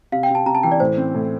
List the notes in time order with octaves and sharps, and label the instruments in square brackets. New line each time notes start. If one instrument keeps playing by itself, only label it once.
[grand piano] C3 [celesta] F5
[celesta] G5
[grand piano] C3 [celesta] A5
[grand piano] C3 [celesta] A#5
[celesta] A5
[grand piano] E3 [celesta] G5
[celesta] D5
[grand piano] A2 [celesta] C5
[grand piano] C4
A2